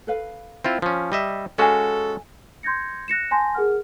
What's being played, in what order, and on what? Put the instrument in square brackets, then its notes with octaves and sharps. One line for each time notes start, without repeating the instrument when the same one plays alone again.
[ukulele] A4 B4 F5
[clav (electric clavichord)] C4 E4 F4
F3 C#4
G3 D#5 E5
[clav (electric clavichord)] G#3 C#4 F#4 [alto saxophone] A4 [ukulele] F5 G#5
[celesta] C6 G6 G#6 A#6 C#7
F#6 A#6 C#7 E7
G#5 A5 C6 G6 A#6
G#4 A#4 F#5 F6